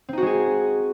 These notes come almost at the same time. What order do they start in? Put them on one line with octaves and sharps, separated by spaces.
C4 D#4 F#4 G#3 G#4